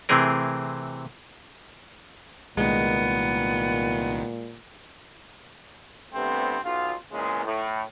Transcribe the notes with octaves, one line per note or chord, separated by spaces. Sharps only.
C3 E3 A3 C4 G#4 A#4
C2 A#2 D#3 G#3 B3
G2 C3 A3 B3 C4
B1 F4
E2 A#2 C#3 G#3
A2